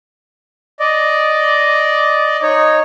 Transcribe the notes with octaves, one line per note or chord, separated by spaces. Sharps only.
D5 D#5
D#4 C#5